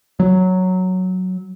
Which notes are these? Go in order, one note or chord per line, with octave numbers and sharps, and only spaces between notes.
F#3